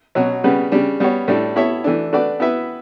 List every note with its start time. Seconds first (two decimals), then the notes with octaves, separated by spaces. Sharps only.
0.15 B2 F#3 C#4 F#4
0.44 C#3 G3 B3 F#4 B4
0.72 C#3 G3 D4
1.00 G3 B3 F#4 C#5
1.28 A2 G3 D4 A4
1.56 B3 E4 A4 C#5 E5
1.84 E3 A3 D4
2.13 A3 D4 F#4 B4 D5
2.40 B3 E4 B4 E5